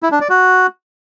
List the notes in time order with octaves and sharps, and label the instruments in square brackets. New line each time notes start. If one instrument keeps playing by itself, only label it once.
[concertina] E4
D4
D5
F#4